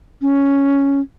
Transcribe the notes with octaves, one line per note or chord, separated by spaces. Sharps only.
C#4